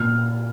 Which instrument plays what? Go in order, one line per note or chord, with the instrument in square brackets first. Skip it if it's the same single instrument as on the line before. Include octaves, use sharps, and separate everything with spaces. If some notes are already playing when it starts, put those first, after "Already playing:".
Already playing: [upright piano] A#2 F6